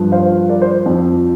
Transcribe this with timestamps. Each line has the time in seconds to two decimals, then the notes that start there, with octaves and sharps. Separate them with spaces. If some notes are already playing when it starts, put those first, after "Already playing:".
Already playing: G2 F3
0.12 C5 F5
0.50 A#4 D5
0.62 C5
0.86 F2 F3